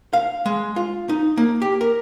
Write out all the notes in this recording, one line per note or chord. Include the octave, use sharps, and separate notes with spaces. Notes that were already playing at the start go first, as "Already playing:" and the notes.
F5
G#3
F4
D#4
A#3
G4
A#4